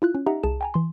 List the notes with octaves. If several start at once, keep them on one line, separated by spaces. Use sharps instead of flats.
E4 F4 F#6
C#4
D#4 G4 D#5 E5 F#5 A#5
C2 G#4 A5 E7
G5 G#5 A#5
E3 C6